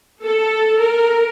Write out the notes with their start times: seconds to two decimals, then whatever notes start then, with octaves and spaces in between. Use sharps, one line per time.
0.24 A4
0.80 A#4